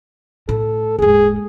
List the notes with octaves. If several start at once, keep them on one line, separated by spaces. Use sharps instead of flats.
A2 A4
D#1 G#2 G#4